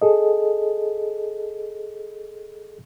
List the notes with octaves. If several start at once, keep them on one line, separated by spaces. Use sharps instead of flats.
G#4 A4 D#5